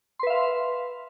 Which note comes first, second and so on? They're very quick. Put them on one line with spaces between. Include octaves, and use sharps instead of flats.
C6 B4 E5 F5